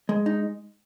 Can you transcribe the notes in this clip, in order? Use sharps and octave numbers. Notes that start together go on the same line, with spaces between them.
G#3
D#4